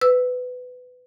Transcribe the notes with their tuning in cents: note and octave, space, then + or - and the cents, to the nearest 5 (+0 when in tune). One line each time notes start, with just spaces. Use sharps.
B4 +20 E6 +0